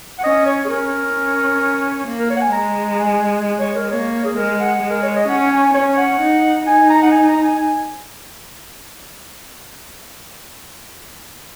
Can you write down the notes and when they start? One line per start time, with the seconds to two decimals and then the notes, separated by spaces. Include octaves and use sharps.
0.19 F#5
0.23 C#4 D#5
0.46 C#5
0.65 G#4
0.69 C#4 A#4
1.15 C#4
2.07 A#3
2.19 A#4
2.30 C#5
2.37 F#5
2.41 G#5
2.52 G#3 A#5
2.91 A#5
2.98 G#5
3.59 C#5
3.75 A#4
3.90 A#3 C#5
4.25 G#4
4.36 G#3 A#4
4.60 F#5
4.83 G#3
4.90 A#4
5.02 C#5
5.16 D#5
5.28 C#4 F#5
5.51 G#5
5.74 C#4 C#5
5.97 F#5
6.20 D#4
6.66 D#4 G#5
6.89 A#5
7.02 F#5
7.12 G#5
7.28 A#5
7.43 G#5
7.58 G#5